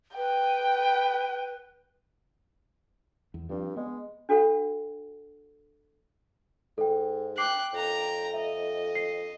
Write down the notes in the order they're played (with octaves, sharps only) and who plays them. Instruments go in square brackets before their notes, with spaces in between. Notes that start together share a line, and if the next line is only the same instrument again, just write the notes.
[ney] B4 [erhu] G5
[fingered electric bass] E2
[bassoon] G2 [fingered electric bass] F3 C4
[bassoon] G#3 [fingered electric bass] B3
[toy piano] D4 F#4 A4 C#5 F#5
[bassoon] G#2 [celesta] A4 G5
[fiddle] G5 F#6 [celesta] D6 C7 F#7
[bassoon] F2 [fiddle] G5 A#5
[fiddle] D#5 [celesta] E5
[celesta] C7